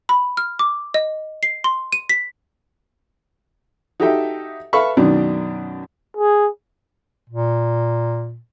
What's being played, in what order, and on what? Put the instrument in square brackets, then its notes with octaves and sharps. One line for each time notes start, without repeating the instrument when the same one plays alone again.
[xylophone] B5
F6
D6
D#5
C7
C6
D#7
B6
[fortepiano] D#4 F#4 G4 A4 E5 G5
A4 B4 E5 F5 B5 C#6
F#2 B2 D#3 D4
[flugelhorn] G#4
[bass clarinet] A#2